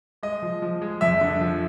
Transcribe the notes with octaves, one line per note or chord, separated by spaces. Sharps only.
G#3 D#5
F3
F3
G#3
F2 E5
D3
F3